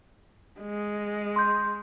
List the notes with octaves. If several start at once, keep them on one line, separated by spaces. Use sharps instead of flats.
G#3
C6 G6